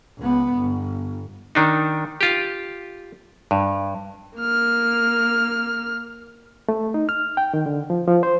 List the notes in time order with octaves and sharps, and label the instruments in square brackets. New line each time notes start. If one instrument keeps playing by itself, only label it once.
[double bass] C#2 B3
G1
[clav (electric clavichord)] D#3 D4 D#4
F4 G4
G2
[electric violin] A#3 F6
[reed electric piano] A3
D#4
F6
G5
D#3
D3
F3
F3
C5